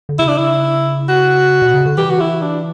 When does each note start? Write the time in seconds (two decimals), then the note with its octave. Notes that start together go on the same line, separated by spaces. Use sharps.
0.09 D3
0.19 C#3 E4
0.28 D4
0.38 E4
1.09 F#4
1.62 B2
1.74 C#3
1.86 D3
1.97 E3 G4
2.10 F#4
2.20 E4
2.42 D4